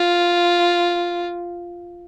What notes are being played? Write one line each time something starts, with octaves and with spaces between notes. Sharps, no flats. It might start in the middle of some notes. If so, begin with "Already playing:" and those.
Already playing: F4